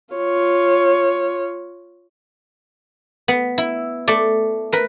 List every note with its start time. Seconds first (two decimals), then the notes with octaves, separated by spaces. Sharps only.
0.14 F4 C#5
3.28 B3
3.58 E4
4.08 A3 D5
4.72 A#4 B4